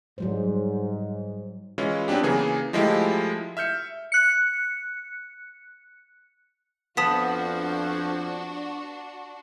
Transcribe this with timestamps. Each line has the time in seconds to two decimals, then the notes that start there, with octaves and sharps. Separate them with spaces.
0.18 G#2 F#3 G3 C5
1.78 E3 G#3 C#4 E4 F4
2.08 F#3 B3 C4 D4 G4
2.23 C#3 E3 A#3 G#4
2.73 F3 G#3 A3 E4 F4 G4
3.57 E5 F6 G6 C#7
4.12 F#6 C#7
6.97 F2 F3 B3 D4 F#4 A5 D#6 B6